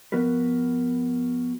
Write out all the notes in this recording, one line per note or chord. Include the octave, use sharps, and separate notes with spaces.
F3 B3 F#4 A#4 B4